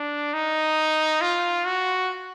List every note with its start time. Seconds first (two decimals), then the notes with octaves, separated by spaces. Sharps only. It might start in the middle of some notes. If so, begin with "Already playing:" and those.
Already playing: D4
0.33 D#4
1.21 F4
1.65 F#4